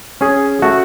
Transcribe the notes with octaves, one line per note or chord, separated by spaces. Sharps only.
C#4 G#4
A3 F#4